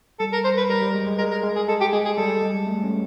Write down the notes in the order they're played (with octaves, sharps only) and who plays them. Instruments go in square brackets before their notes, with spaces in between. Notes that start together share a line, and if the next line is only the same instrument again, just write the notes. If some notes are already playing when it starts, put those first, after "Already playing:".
[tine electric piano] G3 [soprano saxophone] A4
[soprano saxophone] A#4
C5
B4
[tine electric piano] G3 [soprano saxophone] A#4
[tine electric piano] G3
G#3
G#3
[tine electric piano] G#3 [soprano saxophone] A#4
[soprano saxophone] A#4
[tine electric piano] G#3
[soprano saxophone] G#4
[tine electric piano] G#3 [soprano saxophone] A4
[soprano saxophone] G4
[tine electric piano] G#3 [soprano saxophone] G#4
[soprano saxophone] G#4
[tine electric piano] G3 [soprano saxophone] A4
[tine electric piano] G#3
A3
C#4